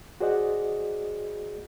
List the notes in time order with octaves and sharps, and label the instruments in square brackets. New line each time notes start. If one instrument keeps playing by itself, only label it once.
[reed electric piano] F#4 G#4 C5 D5 D#5 F#5